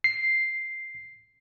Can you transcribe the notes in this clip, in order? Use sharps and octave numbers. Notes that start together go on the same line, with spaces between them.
C7